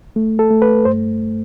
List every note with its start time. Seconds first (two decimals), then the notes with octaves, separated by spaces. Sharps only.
0.16 A3
0.39 A4
0.51 A3
0.62 B4
0.85 G2 C5